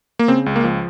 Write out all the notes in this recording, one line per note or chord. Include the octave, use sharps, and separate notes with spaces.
A#3
C#3 C4
C#2
A#3
F3